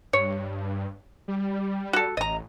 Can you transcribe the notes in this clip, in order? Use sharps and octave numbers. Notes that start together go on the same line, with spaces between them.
G2 C#5
G3
F#4 A4
A1 D#5 A#5